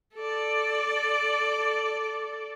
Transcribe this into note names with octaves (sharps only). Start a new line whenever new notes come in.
A4 D5